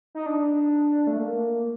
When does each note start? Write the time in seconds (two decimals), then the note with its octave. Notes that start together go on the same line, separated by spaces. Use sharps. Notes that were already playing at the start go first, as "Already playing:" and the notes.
0.15 D#4
0.26 D4
1.07 A3
1.18 A#3